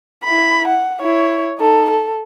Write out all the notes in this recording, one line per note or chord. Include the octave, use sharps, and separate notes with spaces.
E4 B5
F#5
E4 C#5
D#4 A4
A4